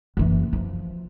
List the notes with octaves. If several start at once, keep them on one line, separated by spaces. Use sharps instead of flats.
F#1 E3
F3